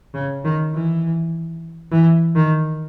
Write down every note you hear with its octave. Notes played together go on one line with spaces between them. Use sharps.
C#3
D#3
E3
E3
D#3